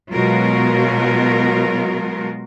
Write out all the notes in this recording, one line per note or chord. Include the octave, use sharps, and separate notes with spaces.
B2 F#3 G#3 F4 F#4 A#4